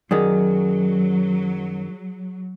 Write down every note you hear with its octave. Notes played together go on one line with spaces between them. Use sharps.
F#2 D#3 F#3 G#4 D5 D#5